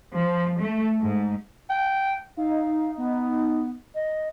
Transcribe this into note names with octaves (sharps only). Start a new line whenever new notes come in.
F3
A3
G#2
G5
D#4 F5
B3
D#5